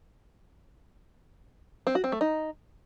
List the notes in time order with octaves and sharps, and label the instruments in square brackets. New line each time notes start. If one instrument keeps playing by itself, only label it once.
[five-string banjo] C4
F#4
C4
A3
D#4